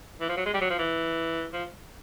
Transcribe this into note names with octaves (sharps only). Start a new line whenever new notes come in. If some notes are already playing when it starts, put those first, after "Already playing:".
E3
F3
F#3
G#3
G3
F#3
F3
E3
F3